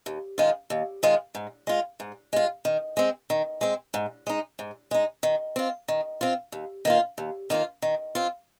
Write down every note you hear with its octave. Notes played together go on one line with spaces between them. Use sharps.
D#2
D#3 G#3 F4
D#2
D#3 G#3 F4
G#2
G#3 F4
G#2
G#3 F4
D#3
G#3 C4
D#3
G#3 C4
G#2
G#3 D#4
G#2
G#3 D#4
D#3
C4 F4
D#3
C4 F4
D#2
D#3 A#3 F4
D#2
D#3 A#3 F4
D#3
C4 F4